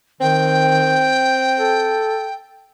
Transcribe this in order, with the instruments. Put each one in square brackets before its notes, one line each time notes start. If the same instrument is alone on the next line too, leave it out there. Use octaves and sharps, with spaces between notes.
[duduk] D#3 [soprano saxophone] C4 [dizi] G5
[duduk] A4